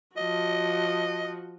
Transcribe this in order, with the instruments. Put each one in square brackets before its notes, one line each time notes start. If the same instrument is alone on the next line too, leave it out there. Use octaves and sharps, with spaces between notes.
[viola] F3 F#4 [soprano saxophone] D#5